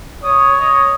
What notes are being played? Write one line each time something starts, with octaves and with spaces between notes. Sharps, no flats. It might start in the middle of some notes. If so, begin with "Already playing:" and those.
C#5 D#6
D#5